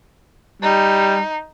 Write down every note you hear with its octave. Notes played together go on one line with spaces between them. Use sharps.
G3 D#4